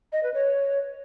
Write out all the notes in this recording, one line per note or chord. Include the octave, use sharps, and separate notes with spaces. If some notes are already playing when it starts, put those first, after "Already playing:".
D#5
B4
C#5